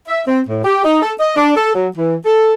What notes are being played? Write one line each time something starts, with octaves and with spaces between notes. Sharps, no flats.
E5
C4
A2
G4
D#4
A4
D#5
D4
A4
F#3
E3
A4